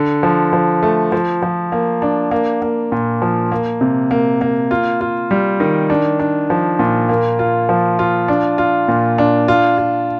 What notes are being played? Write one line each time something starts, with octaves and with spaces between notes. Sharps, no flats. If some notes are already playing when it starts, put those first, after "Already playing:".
Already playing: D3
F3
F3
A3
F3
F3
A#3
D4
A#3
A#3
A#2
F3
A#3
C3
A#3
A#3
F4
F4
G3
D#3
D4
D4
F3
A#2
A#3
F4
F3
F4
D4
F4
A#2
D4
F4
F4